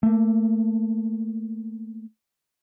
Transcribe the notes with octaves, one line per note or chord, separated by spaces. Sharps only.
A3 A#3